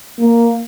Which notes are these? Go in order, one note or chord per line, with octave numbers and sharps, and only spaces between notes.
A#3